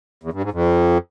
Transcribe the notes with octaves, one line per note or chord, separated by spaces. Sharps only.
E2
G2
G#2
F2